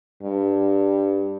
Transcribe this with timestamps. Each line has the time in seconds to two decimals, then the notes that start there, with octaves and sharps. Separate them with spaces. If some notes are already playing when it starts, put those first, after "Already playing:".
0.23 G2